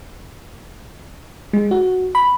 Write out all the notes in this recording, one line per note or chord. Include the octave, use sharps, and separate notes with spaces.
G#3
F#4
B5